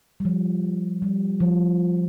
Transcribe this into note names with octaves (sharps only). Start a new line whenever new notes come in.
G3
F3
G3
F3